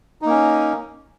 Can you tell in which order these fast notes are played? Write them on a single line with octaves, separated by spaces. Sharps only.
D#4 A#3 C#4